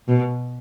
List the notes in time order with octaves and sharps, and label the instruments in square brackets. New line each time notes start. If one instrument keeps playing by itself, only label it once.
[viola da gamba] B2